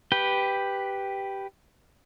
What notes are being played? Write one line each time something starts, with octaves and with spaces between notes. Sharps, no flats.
G4 B4 G5